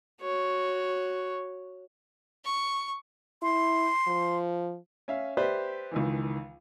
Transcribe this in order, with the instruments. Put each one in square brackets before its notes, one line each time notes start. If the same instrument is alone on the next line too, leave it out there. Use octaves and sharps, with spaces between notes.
[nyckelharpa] F#4 C#5
[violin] C#6
[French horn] E4 [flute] C6
[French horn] F3
[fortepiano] C#4 E5 F5
G4 B4 C5 D5 E5
C#2 D#3 E3